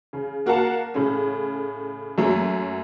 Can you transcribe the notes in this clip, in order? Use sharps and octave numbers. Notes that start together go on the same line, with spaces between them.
C#3
A#3 F#4 A#4 F5 F#5 A5
A2 C#3 C#4
F#2 F#3 A3 A#3